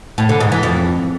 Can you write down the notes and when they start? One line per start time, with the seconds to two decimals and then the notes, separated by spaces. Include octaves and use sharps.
0.18 A2
0.29 D3
0.40 G#2
0.52 E3
0.63 F2